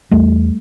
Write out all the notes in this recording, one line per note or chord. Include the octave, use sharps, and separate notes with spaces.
E2 G3 A3